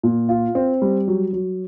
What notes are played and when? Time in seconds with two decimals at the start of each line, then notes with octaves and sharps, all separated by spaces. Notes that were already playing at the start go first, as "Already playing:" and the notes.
0.03 A#2
0.29 F4
0.55 C4
0.82 G3
1.08 F#3
1.33 F#3